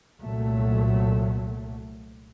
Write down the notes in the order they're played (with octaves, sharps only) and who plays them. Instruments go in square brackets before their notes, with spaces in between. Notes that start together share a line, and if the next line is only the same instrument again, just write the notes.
[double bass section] C2 A#2 F#3 A3